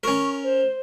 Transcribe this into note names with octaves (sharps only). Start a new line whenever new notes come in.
C#4 A#4 C#6
C5